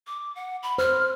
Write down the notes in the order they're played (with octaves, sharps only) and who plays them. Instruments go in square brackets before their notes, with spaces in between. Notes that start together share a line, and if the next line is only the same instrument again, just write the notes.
[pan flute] D6
F#5
B5
[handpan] C5 [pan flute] F6